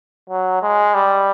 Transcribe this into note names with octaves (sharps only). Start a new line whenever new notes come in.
F#3
G#3
G3